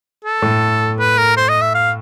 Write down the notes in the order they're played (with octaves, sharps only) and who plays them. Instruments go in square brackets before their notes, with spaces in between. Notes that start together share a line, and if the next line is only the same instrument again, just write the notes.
[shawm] A4
[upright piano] A2
[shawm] B4
A#4
C5
D#5
E5
F5